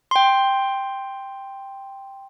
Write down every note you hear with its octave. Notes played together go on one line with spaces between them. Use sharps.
G5 C6